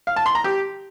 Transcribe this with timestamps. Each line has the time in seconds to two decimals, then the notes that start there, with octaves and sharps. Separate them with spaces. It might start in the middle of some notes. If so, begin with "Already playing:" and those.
0.07 F5
0.16 A5
0.26 C6
0.35 A#5
0.44 G4